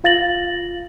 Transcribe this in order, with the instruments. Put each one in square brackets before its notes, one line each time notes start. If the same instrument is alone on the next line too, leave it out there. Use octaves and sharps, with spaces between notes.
[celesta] F4 F5 A6 A#6 F#7